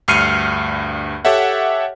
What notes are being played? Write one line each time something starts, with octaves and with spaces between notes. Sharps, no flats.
D2 G2 F6 C7 C#7 D#7
G4 A4 C#5 E5 F#5